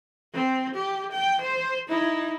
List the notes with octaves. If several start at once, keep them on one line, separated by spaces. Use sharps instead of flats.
C4
G4
G5
C5
D#4 E4